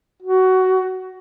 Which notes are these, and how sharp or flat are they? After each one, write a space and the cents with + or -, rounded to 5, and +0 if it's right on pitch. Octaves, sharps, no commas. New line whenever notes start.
F#4 +15